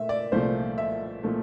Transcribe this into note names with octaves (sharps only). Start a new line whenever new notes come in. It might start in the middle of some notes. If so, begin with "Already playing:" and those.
Already playing: A#2 A3 E5
D5
C2 A#2 F3 A3 C5
E5
A#2 F3 A3